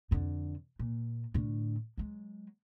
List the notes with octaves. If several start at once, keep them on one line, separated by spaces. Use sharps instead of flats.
F2 D3
A#2
A2 D3
F#3 G#3